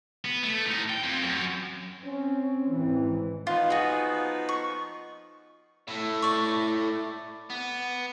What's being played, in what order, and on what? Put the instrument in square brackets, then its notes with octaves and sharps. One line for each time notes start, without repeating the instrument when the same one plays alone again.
[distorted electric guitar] B3
A3
A2 D#4
G5
F2
F#2
[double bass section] C4 [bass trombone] C#4
[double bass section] G#1 E3 [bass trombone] C4
[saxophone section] F3 B3 D#4 [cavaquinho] F4
[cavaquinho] F#4 G#4
C#6
[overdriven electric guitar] A2 A3
[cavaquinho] D5 C#6
[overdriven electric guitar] B3